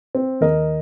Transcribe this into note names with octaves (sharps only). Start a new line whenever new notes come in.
C4
D#2 D#3 A#4 D#5